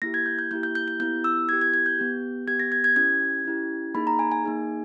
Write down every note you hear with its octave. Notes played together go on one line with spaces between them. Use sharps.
A#3 E4 G4 A#6
G#6
G6
G6
A#3 E4 G4 G6
G6
G6
G6
B3 E4 G4 G6
E6
B3 E4 G4 G#6
G#6
G#6
G6
B3 G4
B3 G4 G#6
A#6
G#6
G#6
C#4 E4 G4 G#6
C#4 E4 G4
A#3 D#4 G#4 B5
A#5
G#5
G#5
A#3 D#4 G#4